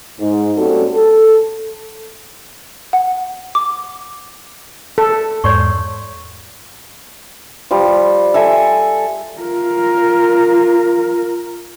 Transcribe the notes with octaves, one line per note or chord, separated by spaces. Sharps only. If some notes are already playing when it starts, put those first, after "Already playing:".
G#2
G3 A#3 C4 C#4 F#4 A4
A4
F#5
D6
A4
E2 G#2 C#5 D5 C6 C#6
F3 G3
A4 E5 G#5
F4 A#4